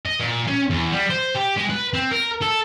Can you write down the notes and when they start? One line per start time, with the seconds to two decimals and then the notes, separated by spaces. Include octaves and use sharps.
0.06 D#5
0.20 A#2
0.47 C#4
0.70 E2
0.93 G3
1.10 C5
1.35 G4
1.57 G#3
1.70 B4
1.93 C4
2.11 A#4
2.42 A4